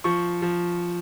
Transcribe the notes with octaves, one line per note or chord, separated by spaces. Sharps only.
F3 C#6
F3